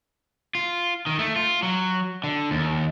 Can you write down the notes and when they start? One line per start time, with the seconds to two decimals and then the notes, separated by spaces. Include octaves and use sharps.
0.55 F4
1.07 D#3
1.19 A3
1.36 F4
1.63 F#3
2.24 D3
2.51 D#2